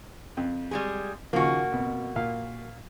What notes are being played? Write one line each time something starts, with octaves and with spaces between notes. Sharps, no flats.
F2
G3 G#3 G#4
D#2 C#3 F3 A#3 F#4
F2 B2
A#2 F5